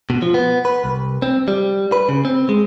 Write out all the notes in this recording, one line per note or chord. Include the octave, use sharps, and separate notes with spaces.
B2
F3
B3
B4
C2
C4
G3
B4
C#3
C4
G#3